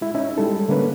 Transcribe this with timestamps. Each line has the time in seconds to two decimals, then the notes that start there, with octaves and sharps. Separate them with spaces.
0.01 G#3 E4
0.15 C#4 D#4 E4
0.38 G3 G#3 A4
0.68 D3 A#3 C#4 B4